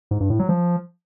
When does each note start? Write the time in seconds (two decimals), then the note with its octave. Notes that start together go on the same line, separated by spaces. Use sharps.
0.11 G#2
0.20 G2
0.30 A2
0.39 F#3
0.49 F3